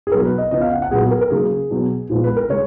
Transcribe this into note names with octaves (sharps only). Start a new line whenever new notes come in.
G#4
B2 F#3 B3 A#4
B4
D#5
C#3 F3 B3 D#5
F5
F#5
F#5
A#2 F#3 B3 G#4
G#4
A#4
A#4
C#3 F#3 A#3 G#4
B2 F#3 B3
A#2 F3 G#3 B3
B4
A#4
C#3 G#3 C#5